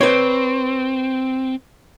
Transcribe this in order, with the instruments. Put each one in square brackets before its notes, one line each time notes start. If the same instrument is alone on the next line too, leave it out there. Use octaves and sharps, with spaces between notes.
[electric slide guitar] C4 [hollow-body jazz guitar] B4 C#5